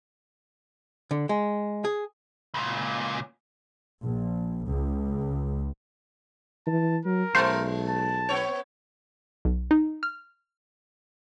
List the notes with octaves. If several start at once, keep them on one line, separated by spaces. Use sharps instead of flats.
D3
G#3
G#4
C#2 A#2
A#1
C#2
E3 A5
F#3 A#4
B1 G#3 C5
A5
B3 C#5
B1
D#4
F6